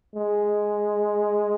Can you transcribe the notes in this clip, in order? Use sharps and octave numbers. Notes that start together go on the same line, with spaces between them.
G#3